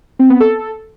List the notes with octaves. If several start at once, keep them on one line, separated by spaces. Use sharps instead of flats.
C4
B3
A4